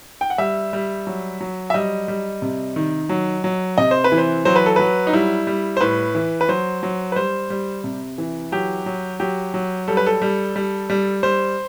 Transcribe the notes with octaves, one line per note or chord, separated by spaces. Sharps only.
G5
F#5
G3 E5
G3
F#3
F#3
E5
G3 D#5
G3
C3
D#3
F#3
F#3
C3 D#5
C5
B4
E3
C5
F#3 C5
B4
A4
F#3 B4
D#4
G3 E4
G3
C5
A2 B4
E3
B4
F#3 C5
F#3
B4
G3 C5
G3
C3
E3
F#3 G4
F#3
F#3 G4
F#3
G3 A4
B4
A4
G3
G3
G3
G3 C5